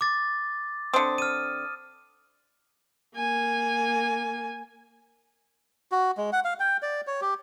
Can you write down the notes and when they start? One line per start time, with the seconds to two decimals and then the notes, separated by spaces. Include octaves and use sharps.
0.01 D6 A6
0.94 D3 C4 D#6
1.18 F6 D#7
3.16 A#3 G#5
5.92 F#4
6.17 G#3
6.33 F#5
6.45 F5
6.60 G5
6.82 D5
7.07 C#5
7.22 G4